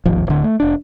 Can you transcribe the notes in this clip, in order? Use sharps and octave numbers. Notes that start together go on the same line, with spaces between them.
D1 G#1 D#2 F3
D1 D3
A3
F1 D4